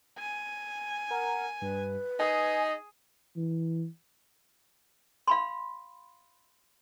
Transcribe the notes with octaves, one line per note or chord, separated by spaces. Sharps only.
G#5
A#4 F#5
G2 B4
D#4 G#4 G#5
E3
F5 B5 C6